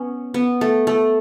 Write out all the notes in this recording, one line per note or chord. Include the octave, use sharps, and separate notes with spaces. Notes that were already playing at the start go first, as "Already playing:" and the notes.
Already playing: B3 C#4
B3
A3
A3